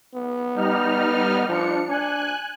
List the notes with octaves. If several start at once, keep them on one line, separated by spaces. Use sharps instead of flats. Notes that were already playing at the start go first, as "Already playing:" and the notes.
B3
G3 D#4 F6
F3 D4 C#7
D4 G#5 F#6